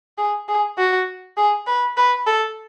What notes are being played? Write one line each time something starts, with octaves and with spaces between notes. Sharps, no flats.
G#4
G#4
F#4
G#4
B4
B4
A4